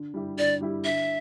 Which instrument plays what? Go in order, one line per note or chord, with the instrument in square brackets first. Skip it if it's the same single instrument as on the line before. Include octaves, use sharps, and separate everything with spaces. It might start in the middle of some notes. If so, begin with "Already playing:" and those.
Already playing: [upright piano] D3
G3 E4 G4
[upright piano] D3 [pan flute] D5
[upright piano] G3 E4 G4
[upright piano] D3 [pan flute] E5